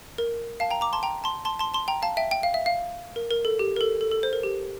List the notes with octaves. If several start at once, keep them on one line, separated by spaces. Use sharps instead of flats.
A#4
F5 A5
G5 A#5
A#5 D6
A5 C6
G5 A#5
A5 C6
A5 C6
A5 C6
A5 C6
G5 A#5
F5 A5
E5 G5
G5
F5
E5
F5
A#4
A#4
A4
G4
A#4
A4
A4
A4
C5
A#4
G4